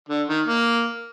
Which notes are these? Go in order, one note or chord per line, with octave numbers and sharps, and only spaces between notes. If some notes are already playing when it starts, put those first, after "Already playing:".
D3
D#3
A#3